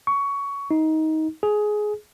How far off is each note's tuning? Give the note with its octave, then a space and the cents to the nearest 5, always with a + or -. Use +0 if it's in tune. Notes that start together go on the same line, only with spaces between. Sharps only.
C#6 +15
D#4 +20
G#4 +15